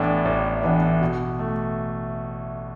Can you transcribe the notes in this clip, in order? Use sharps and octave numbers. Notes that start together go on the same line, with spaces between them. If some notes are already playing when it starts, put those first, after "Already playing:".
Already playing: A1 A2 E3 B3 D4
A1
A2 E3 B3 D4
B2
A3